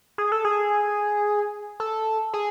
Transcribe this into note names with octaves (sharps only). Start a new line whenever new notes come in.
G#4
A4
G#4
A4
G#4